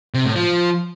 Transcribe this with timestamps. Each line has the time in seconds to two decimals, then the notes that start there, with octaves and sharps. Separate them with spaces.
0.14 C3
0.25 A2
0.36 F3